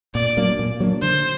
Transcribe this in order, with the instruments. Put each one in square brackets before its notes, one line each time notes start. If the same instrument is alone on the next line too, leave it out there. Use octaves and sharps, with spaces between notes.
[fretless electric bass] A#2 [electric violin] D5
[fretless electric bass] F#3 A#3 D4
A#2
F#3 A#3 D4
[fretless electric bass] D3 [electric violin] C5